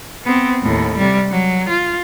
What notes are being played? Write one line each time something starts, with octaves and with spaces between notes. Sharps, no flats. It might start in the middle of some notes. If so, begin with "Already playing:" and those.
B3 C4
D#2 A2
C3 G3
F#3
F4